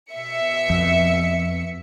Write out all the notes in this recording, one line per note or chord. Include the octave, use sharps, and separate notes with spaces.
B2 E5 C#7
F2